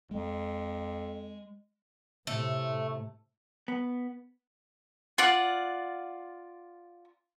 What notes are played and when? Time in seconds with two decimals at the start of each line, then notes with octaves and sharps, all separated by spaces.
0.11 F2 G#3
2.27 A2 C3 A3
3.68 B3
5.18 F4 D5 F#5